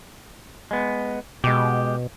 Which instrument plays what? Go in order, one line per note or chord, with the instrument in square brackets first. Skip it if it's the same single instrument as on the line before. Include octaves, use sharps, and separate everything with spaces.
[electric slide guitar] G#3 B3
[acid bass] B2 [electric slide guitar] G#3 G4